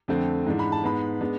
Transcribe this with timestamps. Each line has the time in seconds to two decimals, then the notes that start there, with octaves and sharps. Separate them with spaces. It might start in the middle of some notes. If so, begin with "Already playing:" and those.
0.08 F2 D3 A3 C4
0.46 G#2 E3 G#3 D4
0.59 B5
0.72 A5
0.84 G#2 G#3 B3 B5
1.21 G#3 B3 D4